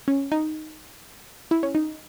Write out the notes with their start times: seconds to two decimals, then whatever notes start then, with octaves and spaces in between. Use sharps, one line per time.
0.08 C#4
0.32 D#4
1.51 E4
1.63 C#4
1.75 D#4